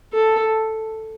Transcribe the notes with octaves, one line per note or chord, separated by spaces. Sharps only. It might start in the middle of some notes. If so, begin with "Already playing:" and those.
A4